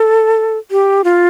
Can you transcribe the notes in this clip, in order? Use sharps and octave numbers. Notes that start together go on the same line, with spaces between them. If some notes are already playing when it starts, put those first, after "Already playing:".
Already playing: A4
G4
F4